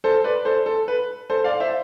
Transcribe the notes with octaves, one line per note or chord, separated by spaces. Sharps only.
A4 C5
B4 D5
A4 C5
A4
B4
A4 C5
D5 F5
C5 E5